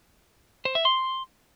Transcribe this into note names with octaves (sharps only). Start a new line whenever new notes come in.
C5
E5
C6